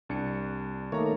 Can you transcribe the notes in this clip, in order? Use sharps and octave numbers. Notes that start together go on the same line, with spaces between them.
C2 D4 C#7
D#3 A3 A#3 C#5 A#5